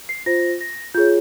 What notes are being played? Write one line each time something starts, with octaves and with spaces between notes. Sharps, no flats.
C7
F4 C5 A#6
A#6
F4 G#4 C#5 G6